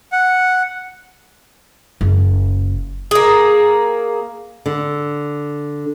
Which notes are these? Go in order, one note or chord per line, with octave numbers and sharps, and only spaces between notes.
F#5
F#1
A#3 G#4
D3